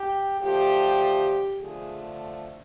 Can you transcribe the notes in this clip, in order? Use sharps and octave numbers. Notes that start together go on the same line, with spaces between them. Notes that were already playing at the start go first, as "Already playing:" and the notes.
Already playing: G4
D3 F3 A3 G4
D3 F3 A3 G#4